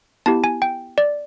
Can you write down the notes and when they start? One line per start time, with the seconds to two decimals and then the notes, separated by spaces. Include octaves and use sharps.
0.26 B3 E4 G4 A5
0.44 G#5
0.62 G5
0.98 D5